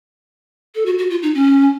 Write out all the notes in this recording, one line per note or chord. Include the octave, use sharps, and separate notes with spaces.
A4
F#4
F#4
F4
D#4
C#4